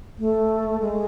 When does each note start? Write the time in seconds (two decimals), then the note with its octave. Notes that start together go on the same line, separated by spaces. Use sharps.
0.19 A3
0.80 G#3